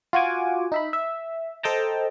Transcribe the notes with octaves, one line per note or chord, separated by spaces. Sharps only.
F4 F#4 F#5 G#5 D6
D#4 E5 B5
E5
A4 C5 D#5 G5 A5 A#5